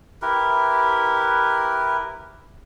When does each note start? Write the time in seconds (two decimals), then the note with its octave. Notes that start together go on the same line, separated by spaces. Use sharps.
0.22 E4 G4 A#4 B4